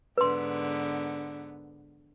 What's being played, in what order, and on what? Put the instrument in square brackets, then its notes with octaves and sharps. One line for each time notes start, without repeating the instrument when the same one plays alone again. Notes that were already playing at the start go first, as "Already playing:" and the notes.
[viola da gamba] G#2 D3 B3 [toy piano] B4 C6